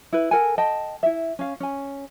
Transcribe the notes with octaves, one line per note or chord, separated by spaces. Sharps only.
E4 B4
A4 A#4 F#5 G#5
D#5 G5 A5
E4 E5
C#4 F5
C#4 G#5